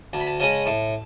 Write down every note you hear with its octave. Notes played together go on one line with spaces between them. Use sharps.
D2 A5
B5
A5
C#3 G#3 C#4 A5
A2 A5